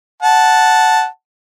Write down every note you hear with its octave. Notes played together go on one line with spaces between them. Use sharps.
F#5 A5